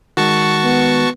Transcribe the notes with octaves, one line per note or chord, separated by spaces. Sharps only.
D#3 G#3 F#4 A5 C#6
B3